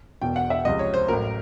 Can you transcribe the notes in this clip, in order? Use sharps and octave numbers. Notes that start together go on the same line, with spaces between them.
E1 E2 B2 G5
F#5
E5
C#2 C3 F3 D#5
C#5
C5
A1 A2 F#3 A#4